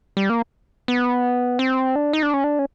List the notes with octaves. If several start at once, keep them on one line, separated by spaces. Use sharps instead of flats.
G3
A#3
B3
C4
D4
D#4
D4
C#4
D4
C#4